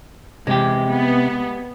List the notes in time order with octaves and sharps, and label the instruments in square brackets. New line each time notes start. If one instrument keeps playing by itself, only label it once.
[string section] E2 [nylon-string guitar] C3 [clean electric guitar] G#3 G4
[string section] B3